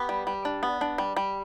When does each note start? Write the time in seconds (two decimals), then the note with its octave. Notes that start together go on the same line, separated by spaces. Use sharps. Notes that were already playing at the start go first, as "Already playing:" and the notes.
Already playing: B3 G4 B4
0.09 G3
0.27 G3
0.45 D4
0.63 B3
0.81 D4
0.98 G3
1.17 G3